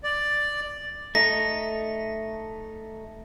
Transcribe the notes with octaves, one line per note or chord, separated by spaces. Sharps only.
D5
A3 D#4 A#6